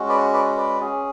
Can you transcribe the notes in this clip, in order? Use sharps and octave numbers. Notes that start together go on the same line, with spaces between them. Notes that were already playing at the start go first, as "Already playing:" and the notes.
Already playing: G#3 C#4 F#4
B4 D5
B4 D5
B4 D5
C#4 G#4